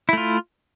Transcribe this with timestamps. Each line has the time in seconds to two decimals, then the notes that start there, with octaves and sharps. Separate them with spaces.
0.09 E4
0.13 A3
0.17 F4